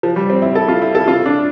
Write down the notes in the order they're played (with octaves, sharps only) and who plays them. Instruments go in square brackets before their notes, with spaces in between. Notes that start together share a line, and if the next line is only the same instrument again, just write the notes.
[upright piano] F3
G3
C4
E4
A4
F4
E4
A4
F4
D4